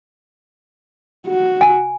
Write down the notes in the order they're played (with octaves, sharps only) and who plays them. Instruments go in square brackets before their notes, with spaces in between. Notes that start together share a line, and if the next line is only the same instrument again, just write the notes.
[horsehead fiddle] F#4
[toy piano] G#5